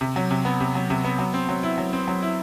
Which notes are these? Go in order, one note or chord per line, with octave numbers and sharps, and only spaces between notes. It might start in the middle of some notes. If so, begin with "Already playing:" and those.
C3
F#3
C3
B3
C3
F#3
C3
B3
F#3
C4
F#3
E4
F#3
C4
F#3
E4